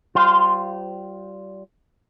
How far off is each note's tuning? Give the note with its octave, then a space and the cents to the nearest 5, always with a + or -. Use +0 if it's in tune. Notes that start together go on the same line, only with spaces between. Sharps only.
G3 -25 F4 +0 C5 -20